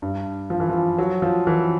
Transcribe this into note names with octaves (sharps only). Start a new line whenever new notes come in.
G2
F3
E3
F3
F#3
F3
E3